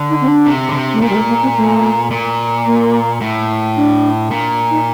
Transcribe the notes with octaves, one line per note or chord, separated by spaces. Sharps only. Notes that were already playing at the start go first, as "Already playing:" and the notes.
Already playing: D3
D#4
C4
D4
C3
D3
C3
A3
A#2 A#3
G3
A3
A#3
C4
A3
A#2
A#3
A2
D4
A#2
D#4